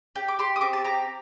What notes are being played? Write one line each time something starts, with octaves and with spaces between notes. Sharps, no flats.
G4 G5
D6
G4 C6
D#6
C4 D6
A5
G4 A#5